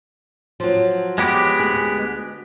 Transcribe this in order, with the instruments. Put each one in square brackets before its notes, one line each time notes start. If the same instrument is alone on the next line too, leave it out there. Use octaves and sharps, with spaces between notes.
[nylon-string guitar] F3 F#3
[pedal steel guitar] G#3 B3 G4
[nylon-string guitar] D2 G#4